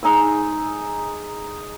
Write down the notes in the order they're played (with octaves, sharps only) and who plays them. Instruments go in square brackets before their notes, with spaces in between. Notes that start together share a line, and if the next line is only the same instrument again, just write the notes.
[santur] G#3 D#4 G#5 E6